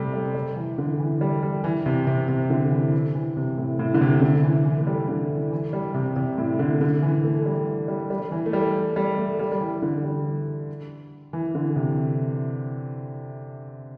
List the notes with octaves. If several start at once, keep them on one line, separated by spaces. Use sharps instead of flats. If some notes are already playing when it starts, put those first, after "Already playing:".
Already playing: C3 G3 A3
G3
G3
E3
D3
E3
G3
G3
E3
C3
C3
C3
D3
E3
E3
E3
C3
A2
A2
D3
C3
D3
E3
E3
A3
G3
D3
E3
E3
G3
C3
C3
A2
D3
D3
E3
A3
G3
E3
G3
G3
E3
A3
G3
G3
A3
G3
G3
E3
D3
G3
E3
D3
C3